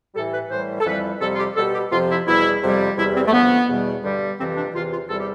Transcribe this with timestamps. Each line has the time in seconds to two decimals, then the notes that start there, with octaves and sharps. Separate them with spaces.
0.14 A2 E3 G3 A4
0.32 B4
0.50 A2 E3 G3 C5
0.80 A4
0.85 F2 E3 G3 B4
1.20 F2 C3 G3 A4
1.34 F4
1.38 G4
1.56 B2 G3 A4
1.73 G4
1.91 F2 C3 F3 F4
2.09 E4
2.27 E2 B2 G3 E4
2.62 F2 C3 G3
2.97 E2 C3 G3 E4
3.15 C4
3.27 A3
3.32 F2 D3 F3 B3
3.68 E2 B2 G3
4.03 G2 D3 G3
4.38 F2 C3 E3 G3 C4
4.56 D4
4.73 E2 C3 E3 F4
4.91 F4
5.09 E2 C3 G3 A4
5.19 G4